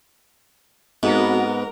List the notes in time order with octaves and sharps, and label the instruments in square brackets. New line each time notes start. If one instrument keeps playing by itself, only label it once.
[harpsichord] G#2 [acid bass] B3 [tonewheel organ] C4 F#4 A4 [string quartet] A#4